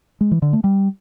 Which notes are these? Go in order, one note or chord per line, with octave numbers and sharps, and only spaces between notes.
G#3
E3
D3
A3
G3